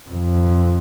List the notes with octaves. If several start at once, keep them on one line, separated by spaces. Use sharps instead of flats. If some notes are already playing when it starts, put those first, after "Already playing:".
F2